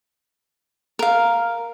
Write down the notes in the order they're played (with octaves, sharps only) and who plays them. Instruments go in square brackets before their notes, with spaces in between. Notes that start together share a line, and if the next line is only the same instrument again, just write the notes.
[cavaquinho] A#4 F5